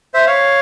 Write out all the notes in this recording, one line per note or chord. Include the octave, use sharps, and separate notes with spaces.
C5 E5
C#5 F5